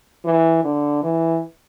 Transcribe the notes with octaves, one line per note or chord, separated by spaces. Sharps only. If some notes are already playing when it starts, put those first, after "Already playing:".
E3
D3
E3